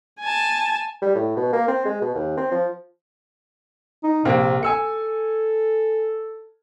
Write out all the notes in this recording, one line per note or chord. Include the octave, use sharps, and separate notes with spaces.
G#5 A5
G3
A2
B2
A#3
C4
G#3
B2
D#2
C4
F3
D#4
A#1 C3 A#3 C4
A4 G#5 E6 C#7